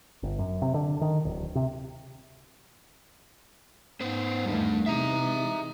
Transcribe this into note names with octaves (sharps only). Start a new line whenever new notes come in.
G1
F#2
C3
D3
D#3
D1
C3
G#2 B3 C5
E2 D#3 G3 A3 D4
C3 E3 G#3 D#4 E5 A#5